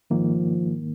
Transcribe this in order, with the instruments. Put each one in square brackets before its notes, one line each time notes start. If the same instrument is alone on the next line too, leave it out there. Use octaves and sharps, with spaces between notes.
[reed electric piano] G#2 D#3 A#3 [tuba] F3